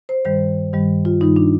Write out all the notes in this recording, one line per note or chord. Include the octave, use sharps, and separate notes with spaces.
C5
G2 D#3 G3 C5
G2 D#3 G3
F4
G2 D#3 G3 D#4
D4